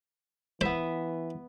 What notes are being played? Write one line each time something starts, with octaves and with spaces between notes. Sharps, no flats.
E3 B3 B4 C5 E5